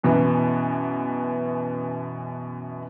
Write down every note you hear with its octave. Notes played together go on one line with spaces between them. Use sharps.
F#2 B2 E3 B3